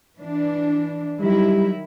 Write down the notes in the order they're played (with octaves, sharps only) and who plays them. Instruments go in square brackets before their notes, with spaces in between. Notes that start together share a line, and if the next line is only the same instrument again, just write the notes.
[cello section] E3 D4
[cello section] D#3 F#3 E4 [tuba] G3